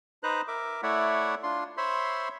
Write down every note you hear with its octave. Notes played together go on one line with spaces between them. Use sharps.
D#4 B4 C5 A#5 F#6
A#4 E5 D6
A3 E4 C#5 D5 E5 F#5
D4 F4 C6
C5 C#5 E5 B5 C6